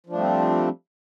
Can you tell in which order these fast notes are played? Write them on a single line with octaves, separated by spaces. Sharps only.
F3 D4 A3 G3 C4